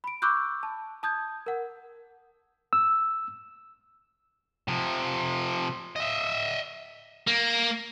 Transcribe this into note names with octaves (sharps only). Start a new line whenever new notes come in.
B5 D7
B5 C#6 D6 E6 F#6 G6
A5
A5 D#6 G6 G#6
A#4 F#5
E6
C3 F3
D#5 E5
A#3